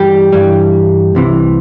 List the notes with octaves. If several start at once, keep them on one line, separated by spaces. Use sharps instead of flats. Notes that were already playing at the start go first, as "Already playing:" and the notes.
Already playing: G2 E3 G3 G4
G2 E3 G3
C2 C3 E3